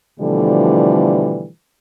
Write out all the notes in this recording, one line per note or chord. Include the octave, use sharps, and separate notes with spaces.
B2 D3 E3 F3 G3 A3